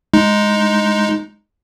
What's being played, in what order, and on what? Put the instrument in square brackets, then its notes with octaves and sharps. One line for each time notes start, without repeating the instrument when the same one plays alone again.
[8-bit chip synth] G#3 D#4